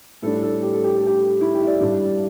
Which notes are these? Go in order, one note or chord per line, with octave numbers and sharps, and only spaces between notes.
A2 G3 D4 A4
A4
G4
A4
G4
A4
G4
E4
G4
E5
D5
G2 G3 D4